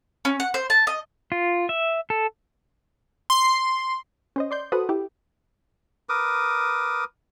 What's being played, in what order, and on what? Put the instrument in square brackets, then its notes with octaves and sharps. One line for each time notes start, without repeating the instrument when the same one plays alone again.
[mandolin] C#4
F#5
C5
A5
D#5
[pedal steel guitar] F4
E5
A4
[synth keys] C6
[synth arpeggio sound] C#4 C5 D#5
D5 C6 G6
F#4 A4 B4 C5 F#5 D#6
E4 G4
[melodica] A#4 B4 D6 D#6